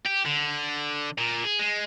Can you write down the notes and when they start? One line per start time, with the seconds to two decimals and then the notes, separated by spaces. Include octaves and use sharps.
0.06 G4
0.26 D3
1.18 A#2
1.44 G#4
1.59 G#3